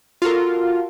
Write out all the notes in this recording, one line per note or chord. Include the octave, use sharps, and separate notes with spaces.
F4 F#4 A4 A#4